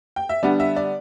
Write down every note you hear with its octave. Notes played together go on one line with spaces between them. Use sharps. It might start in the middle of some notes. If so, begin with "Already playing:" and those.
G5
E5
D3 G3 B3 D4 D5
E5
D5